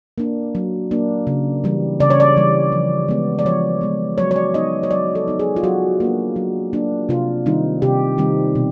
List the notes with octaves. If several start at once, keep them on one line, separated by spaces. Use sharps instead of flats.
A#3 D4
F#3
A#3 D4
C#3
E3 G3
C#3 D5
C#5
D5
E3 G3
F3
G#3 B3
D5
F3 C#5
G#3 B3
F#3 C#5
C#5
D5
B3 D#4 D#5
C#5
F#3 D5
A4
B3 D#4
G#4
F4
F#3 F#4
A#3 D4
F#3
A#3 D4
C3 F4
D#3 G3 C4 D#4
C3 G4
D#3 G3 C4 D#4
B2